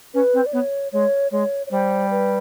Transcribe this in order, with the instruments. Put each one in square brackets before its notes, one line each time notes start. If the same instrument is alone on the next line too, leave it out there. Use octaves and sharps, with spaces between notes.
[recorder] C#4 [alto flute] B4
[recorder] C4
[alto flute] D5
[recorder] B3 [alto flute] C#5
[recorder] G#3 [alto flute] C#5
[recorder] G#3 [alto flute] C#5
[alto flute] C#5
[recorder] G3 [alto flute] C5
[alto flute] B4